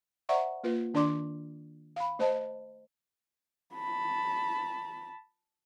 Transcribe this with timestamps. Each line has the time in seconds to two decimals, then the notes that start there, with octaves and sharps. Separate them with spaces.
0.29 C5 D5 E5 F#5 A#5 C#6
0.63 A#3 F4 B4
0.94 D#3 D4 D5 C6 D6
1.96 F5 B5
2.19 A3 C5 D#5 A5
3.75 A5 B5